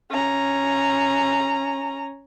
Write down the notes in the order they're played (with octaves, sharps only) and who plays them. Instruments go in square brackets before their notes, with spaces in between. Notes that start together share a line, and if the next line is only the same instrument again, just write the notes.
[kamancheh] C#4 A#5